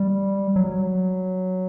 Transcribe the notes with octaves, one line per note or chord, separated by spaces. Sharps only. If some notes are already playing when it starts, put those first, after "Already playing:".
Already playing: G3
F#3